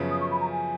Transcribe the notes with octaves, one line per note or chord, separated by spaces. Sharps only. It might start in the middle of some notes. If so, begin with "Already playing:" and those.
Already playing: F#2 C#3 F3 B3
D#6
C#6
B5
A#5
G#5